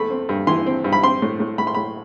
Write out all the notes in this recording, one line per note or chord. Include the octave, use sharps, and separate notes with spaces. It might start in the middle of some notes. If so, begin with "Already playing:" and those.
Already playing: E2 A3 B5
C4
G2
E3 C6
C4
G2
B5
C4 C6
A2
A2
A2 B5
C6
A2 B5